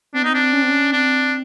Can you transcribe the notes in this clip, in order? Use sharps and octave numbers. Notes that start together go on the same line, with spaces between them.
C4 D4
B3 D#4
C4 D4
C#4
C4
C#4
C4 D4